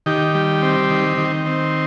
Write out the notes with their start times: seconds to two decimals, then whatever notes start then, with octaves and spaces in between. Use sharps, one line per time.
0.06 D#3 G4
0.34 G3
0.62 C4
0.90 D#3
1.18 D#3
1.46 C4